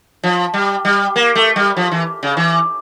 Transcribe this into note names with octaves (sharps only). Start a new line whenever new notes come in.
F3
G3
G3
A#3
A3
G3
F3
E3
C#3
E3